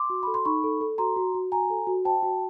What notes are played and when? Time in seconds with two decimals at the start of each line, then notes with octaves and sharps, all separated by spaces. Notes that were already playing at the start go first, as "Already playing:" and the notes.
Already playing: C6 D6
0.10 F#4
0.23 A4 B5
0.34 C6
0.45 D#4 B5 C#6
0.64 A4
0.81 A4
0.98 F#4 A#5 C6
1.16 F#4
1.34 F#4
1.52 F#4 G#5 A#5
1.70 A4
1.87 F#4
2.05 C5 G5 A5
2.23 F#4